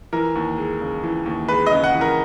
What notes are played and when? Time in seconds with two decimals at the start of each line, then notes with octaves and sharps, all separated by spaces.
0.13 E3 A#4
0.35 D#2
0.58 G#3
0.81 C#3
1.03 E3
1.26 D#2
1.48 G#3 B4
1.67 C#3 D#5
1.84 F#5
1.95 E3
2.01 A#4